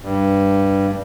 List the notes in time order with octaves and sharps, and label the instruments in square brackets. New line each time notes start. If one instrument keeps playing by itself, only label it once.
[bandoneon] G2